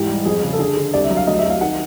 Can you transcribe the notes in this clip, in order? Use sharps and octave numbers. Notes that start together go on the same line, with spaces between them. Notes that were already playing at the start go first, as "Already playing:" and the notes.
Already playing: G#2 E3 G4
G3
F2 G#4
C#3
A4
D3 G#4
D3
C2 D5
E5
F#3
F5
D2 D#5
E5
D2
F5
D#3 F#5